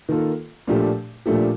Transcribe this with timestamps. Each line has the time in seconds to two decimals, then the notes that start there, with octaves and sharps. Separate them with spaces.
0.09 D#3 A#3 F4 A4
0.67 A#2 F3 A3 D4 G4
1.26 A#2 F3 A3 D4 G4